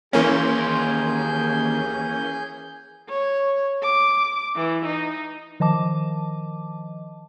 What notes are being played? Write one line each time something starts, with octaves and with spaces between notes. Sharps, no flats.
D#2 E3 A#3 C#4 G#4 C6 G6
C#5
D6
E3
D#4
D#3 F3 D#5 A5 D6